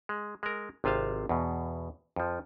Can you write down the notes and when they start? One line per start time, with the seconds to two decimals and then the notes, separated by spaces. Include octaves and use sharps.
0.09 G#3
0.43 G#3 A#4
0.84 G#1 C3 F4 C5 F5
1.29 E2 B2
2.16 F2 F3